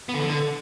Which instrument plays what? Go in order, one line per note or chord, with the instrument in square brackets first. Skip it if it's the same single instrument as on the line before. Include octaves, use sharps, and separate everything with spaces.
[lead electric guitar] B3
D3
E3
D3